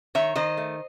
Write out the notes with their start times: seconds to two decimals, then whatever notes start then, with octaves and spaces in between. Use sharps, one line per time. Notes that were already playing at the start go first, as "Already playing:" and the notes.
0.15 D#3 C#5 E5
0.35 D#3 C5 D#5
0.57 A3